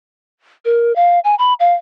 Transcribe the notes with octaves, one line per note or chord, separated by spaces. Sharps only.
A#4
F5
G#5
B5
F5